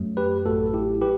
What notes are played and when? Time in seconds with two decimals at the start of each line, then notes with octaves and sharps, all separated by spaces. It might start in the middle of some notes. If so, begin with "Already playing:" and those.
Already playing: F#2 F#3 A3
0.17 G4 B4
0.45 A1 A2 F#3 A3 F#4 A4
0.74 E4 G4
1.02 F#3 G4 B4